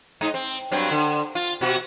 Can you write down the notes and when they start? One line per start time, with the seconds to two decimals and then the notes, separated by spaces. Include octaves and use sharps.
0.21 G#2 D#4
0.34 C4
0.71 G2 F#3 C4
0.91 D3
1.35 F4
1.61 B2 F#4